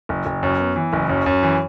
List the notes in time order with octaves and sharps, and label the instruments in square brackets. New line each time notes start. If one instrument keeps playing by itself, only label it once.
[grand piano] F#1
F#1
F#2
B3
E3
F#1
F#2
F#2
E3